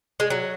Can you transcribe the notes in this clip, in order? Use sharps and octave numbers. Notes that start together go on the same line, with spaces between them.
G#3
F#3